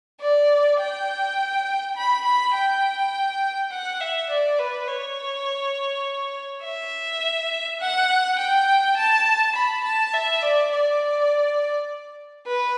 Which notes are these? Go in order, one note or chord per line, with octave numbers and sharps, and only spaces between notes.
D5
G5
B5
B5
G5
F#5
E5
D5
B4
C#5
E5
F#5
G5
A5
B5
A5
E5
D5
D5
B4